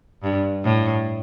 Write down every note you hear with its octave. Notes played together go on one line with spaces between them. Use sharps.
G2
A2